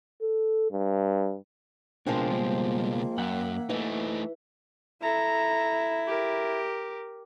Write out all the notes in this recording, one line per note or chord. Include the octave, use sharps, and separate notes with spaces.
A4
G2
C#2 B2 F3 G#3 C4 D4 A#4
G3 A#3
F#2 E5 F#5 G5
E3 A3 D#4
E4 A4 A#5
G4 A#4